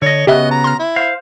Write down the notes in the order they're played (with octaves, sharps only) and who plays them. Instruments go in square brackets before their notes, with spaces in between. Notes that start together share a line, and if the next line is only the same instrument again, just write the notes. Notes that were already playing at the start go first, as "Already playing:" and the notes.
[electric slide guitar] D3 D#5 [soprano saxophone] C#5
[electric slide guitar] C#3 B3 F#4 [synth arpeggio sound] G4 E5 [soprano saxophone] D#5
[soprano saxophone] A#5
[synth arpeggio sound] C6 F6
[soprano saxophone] E4
[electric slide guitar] C5 F5